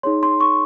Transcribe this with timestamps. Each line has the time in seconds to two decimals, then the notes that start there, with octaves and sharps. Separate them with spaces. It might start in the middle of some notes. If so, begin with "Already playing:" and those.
0.03 D#4 G#4 C#5 C6
0.23 C6
0.41 C#6